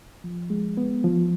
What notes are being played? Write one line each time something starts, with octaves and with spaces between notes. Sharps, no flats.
F3
G#3
B3
F3